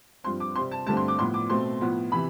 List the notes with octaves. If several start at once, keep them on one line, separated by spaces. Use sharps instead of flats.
G2 F3 C4 C6
D6
C3 G3 C4 C6
A5
G2 D3 A3 C4 A5
C6
D6
A2 F3 B3 C6
D6
B2 A3 C4 C6
A2 F3 B3
C3 E3 B5